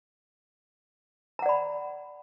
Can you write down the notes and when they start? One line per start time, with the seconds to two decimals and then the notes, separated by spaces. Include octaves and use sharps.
1.39 A#5
1.42 F#5
1.46 D5
1.49 B5